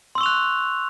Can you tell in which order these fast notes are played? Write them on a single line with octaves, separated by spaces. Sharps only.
C6 E6 C#6 F7 F#6